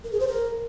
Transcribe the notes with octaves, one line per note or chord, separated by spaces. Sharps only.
A#4
G#4
C5
A#4